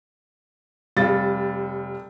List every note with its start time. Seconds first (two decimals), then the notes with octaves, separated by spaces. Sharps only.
0.97 F1 G3 F4 A6